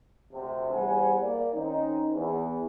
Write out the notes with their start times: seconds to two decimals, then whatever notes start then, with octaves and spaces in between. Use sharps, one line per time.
0.31 D2 C3
0.71 E2 G3 G#4 C5 F#5 G#5
1.22 A#3 D5
1.53 D#3 C4 C#4 D#4
2.13 E2